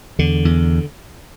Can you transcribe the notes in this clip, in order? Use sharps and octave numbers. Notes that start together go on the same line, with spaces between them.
E2 D3
E2